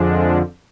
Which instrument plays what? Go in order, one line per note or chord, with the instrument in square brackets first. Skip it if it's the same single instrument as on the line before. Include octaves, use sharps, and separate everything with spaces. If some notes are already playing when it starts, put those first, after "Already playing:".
Already playing: [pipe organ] F2 D3 F3 G#3 D4